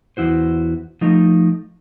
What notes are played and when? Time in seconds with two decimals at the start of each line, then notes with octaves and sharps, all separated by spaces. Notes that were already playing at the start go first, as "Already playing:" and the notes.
0.17 E2 E4 F#4 C5
1.01 F3 A3 D#4